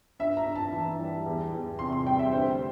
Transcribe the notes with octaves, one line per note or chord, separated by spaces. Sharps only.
G2 E5
A#5
G2
A5
E3
G3
E2
E2
C3 C6
C6
G3 G5
E5
D2 C5